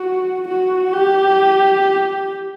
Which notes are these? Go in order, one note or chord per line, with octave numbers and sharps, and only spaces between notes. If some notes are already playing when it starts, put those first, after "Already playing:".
Already playing: F#4
F#4
G4